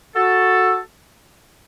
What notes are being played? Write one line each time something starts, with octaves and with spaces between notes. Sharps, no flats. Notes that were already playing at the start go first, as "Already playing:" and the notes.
F#4 A4